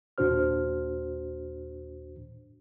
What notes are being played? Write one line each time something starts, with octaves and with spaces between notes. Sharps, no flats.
D#2 A#2 D4 F#4 C5 F6